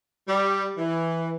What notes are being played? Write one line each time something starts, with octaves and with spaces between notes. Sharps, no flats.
G3
E3